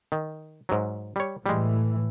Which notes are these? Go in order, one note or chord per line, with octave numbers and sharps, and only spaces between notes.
D#3
G#2 F#3
G3 C#5
A2 E3 G3 G#3